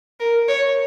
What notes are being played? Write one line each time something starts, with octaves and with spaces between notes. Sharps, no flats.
A#4
C#5